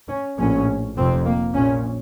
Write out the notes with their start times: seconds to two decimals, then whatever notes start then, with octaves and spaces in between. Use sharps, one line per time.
0.09 C#4
0.38 A#1 A2 C#4
0.96 F1 F2 C3 C4
1.26 A#3
1.55 A#1 A#2 C#4